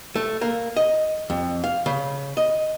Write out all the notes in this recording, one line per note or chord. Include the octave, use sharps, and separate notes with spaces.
A3
A#3
D#5
F2
F5
C#3
D#5